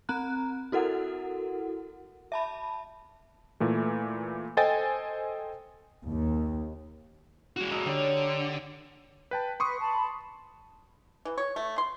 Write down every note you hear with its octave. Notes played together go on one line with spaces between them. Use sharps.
C4 A#5 F#6
E4 F#4 A4 A#4 F#5
E5 A5 B5
A#2 E3 A3
A4 C5 D#5 G5 G#5 A6
D#2
G#3 F#4
D#4 A4 A#4
D3 G4 C#5 D5
B4 G5 A5
B4 C6 C#6 D#6
A5 B5
E3
C#5
A3
C6